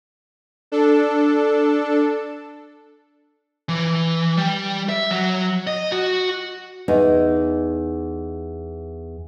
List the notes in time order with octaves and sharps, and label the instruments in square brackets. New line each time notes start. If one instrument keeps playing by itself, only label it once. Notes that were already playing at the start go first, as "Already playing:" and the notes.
[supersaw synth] D4 A4
[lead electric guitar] E3
G3
E5
F#3
D#5
F#4
[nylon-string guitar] E2 D#4